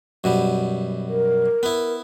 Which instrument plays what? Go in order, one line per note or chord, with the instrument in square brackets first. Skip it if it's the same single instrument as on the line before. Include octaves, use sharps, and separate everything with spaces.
[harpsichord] F#2 B2 G3
[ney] A#4
[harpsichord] B3 E4